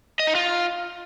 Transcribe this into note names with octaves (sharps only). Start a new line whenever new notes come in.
D#5
D#4
F4